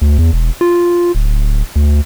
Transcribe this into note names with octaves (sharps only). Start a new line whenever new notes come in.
D2
E2
E1
F4
D1
D2